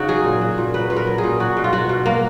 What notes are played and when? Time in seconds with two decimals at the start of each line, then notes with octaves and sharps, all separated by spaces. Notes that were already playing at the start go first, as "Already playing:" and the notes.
Already playing: C#3 D#4 F#4
0.08 F#3 G#4
0.25 A#2
0.41 F#3
0.58 A#2
0.74 F#3 B4
0.90 A#2 B4
0.96 A#4
1.07 F#3
1.18 G#4
1.24 A#2
1.40 F#3 F#4
1.57 B2
1.64 F4
1.73 F#3 F#4
1.89 B2
2.06 F#3 A#3